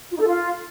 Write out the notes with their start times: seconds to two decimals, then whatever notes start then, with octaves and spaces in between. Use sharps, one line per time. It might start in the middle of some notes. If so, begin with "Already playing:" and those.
0.11 F4
0.16 D#4
0.21 A4
0.26 F4